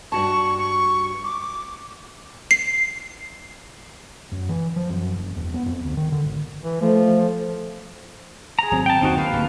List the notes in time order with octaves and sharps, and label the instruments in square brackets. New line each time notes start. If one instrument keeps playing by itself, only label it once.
[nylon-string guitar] G2 F#4 A5 [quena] C#6
[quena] C#6
D6
[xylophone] C7
[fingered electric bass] F#2
E3
F3
F#2
F#1
E1
B3
F2
D2
D#3
D3
G#1
[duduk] E3
[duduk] F3 [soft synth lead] A3
[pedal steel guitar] G#4 A#5
[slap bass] G#1 F#3 C4
[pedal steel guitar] G5 A5
[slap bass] F#1 D#2 B2 [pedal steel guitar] C4 D#4 F#4
[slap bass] D#3 [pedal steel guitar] A#3 B4 F5
[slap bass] D1 G2